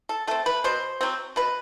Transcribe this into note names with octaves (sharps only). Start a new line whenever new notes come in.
A4
A3 C4 A4
B4
B2 C5
F#3 C4
B2 B4